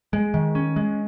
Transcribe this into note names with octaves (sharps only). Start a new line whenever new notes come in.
G#3
D#3
C#4
G#3